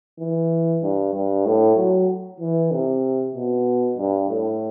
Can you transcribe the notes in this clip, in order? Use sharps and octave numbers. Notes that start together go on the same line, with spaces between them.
E3
G2
G2
A2
F#3
E3
C3
B2
G2
A2